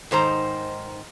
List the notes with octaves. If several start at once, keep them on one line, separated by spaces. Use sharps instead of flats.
G#2 D#3 C5 A#5